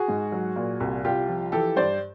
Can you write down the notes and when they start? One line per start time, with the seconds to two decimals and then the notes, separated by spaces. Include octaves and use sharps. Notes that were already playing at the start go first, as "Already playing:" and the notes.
Already playing: F#4 G#4
0.08 G#2
0.32 F#3
0.56 A#2
0.80 C2
1.04 C2 F4 G4
1.28 F3
1.52 E3 G4 A4
1.76 G2 C5 D5